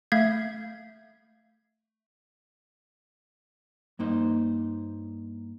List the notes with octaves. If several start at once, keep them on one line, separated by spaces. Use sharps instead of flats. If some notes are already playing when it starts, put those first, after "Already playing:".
A3 E5 F5 G6 G#6
G2 A#3 D#4 C5